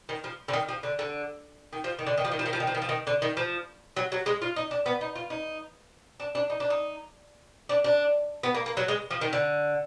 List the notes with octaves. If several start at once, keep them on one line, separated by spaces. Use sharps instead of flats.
D#3
F3
D3
D#3
F3
D3
D3
D#3
F3
D#3
D3
D#3
F3
D#3
F3
D#3
F3
D#3
F3
D#3
F3
D#3
D3
D#3
F3
F#3
F#3
G#3
F4
D#4
D4
B3
D#4
F4
D#4
D4
D4
D#4
D4
D#4
D4
D4
B3
A#3
A#3
F#3
G#3
F3
D#3
D3